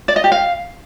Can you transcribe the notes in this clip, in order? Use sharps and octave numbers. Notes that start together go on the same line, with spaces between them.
D5
D#5
G4
F5